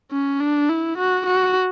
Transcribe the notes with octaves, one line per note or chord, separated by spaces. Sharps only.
C#4
D4
E4
F#4
F#4